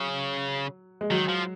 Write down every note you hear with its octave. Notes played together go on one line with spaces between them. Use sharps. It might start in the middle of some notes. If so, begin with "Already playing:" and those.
Already playing: C#3 F#3
G#3
D#3 F#3
F3